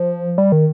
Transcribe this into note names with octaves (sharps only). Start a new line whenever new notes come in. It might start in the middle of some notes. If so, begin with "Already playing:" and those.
Already playing: F3
G3
D#3